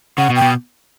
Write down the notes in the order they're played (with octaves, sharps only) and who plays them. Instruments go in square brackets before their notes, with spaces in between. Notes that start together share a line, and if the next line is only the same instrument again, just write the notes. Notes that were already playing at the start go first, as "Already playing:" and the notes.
[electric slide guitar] C#3 [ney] F#5
[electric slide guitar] B2
[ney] G5
[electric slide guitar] B2